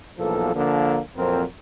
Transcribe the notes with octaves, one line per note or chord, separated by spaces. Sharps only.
B1 E2 F3 A#3 A4
D3 F3 A#3
F2 A#2 F#3 C4 A#4